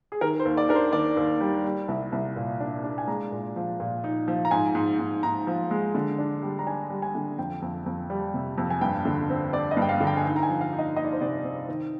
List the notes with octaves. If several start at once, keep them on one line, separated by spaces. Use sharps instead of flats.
G#4
D#3 A#4
C5
D#2
D5
D4 A#4
C5
D#3 D5
D#2
G3
G3
C2
C2
A#2
D4
D4
G#5
G#3 A#5
A#2
F3
A#2
D#4
F3
A#5
G#2 G#5
G#2
G#2
G#2 A#5
F3
G#3
D3
D4
G3
A#5
D4 G#5
G3
G#5
D3
F2 G5
F2
F2
G3
C3
F2
G#5
G2 G5
D3
C4
C4 D5
D#5
G2
G5
F5
D3
G5
G#5
D#4 G5
A#5
G#5
F3
F5
D#4
D#5
D#4 D#5
D5
C5
C3 D5
C4
D#3